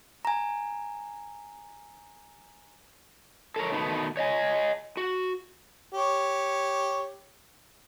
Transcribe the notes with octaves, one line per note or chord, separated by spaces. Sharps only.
G#5 A#5
A4 A#4 C#5
B2 D#3 A3 B3
C#5 D#5 G#5
F#4
G4 C#5